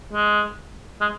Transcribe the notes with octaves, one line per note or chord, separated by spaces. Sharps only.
G#3
G#3